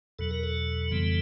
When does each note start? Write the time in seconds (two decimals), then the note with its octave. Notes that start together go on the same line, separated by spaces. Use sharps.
0.19 E2 B2 F#3 A4
0.31 A#4
0.44 A4
0.91 F2 C#3 E3 G3 B3